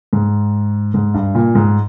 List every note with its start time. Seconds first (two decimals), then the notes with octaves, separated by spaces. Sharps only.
0.13 G#2
0.94 G#2
1.14 G2
1.35 A#2
1.55 G#2